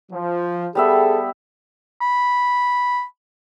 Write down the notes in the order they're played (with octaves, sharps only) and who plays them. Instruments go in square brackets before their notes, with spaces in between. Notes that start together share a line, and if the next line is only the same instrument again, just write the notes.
[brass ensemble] F3
[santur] G3 B3 E5 [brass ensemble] G#4 A4
[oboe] B5